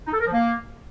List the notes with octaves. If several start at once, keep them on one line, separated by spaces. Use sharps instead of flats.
D#4
A4
A#4
F3
A#3